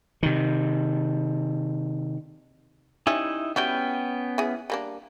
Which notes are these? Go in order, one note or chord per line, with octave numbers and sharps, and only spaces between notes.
C3 D#3
E3 G3 C#4 D#4 E4
G3 B3 C#4 E4 F#4 G5
E3 G#4
G3 A#3 D4